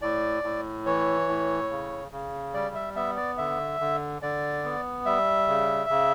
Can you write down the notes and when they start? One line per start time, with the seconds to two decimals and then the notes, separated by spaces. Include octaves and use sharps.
0.02 A2 D5
0.43 A2
0.86 E3 C#5
1.28 A2
1.70 C#3
2.11 C#3
2.54 G3 D5
2.75 E5
2.95 B3 E5
3.17 D5
3.38 D3 E5
3.80 D3
4.22 D3 D5
4.64 B3
5.06 G3 E5
5.48 C#3
5.90 C#3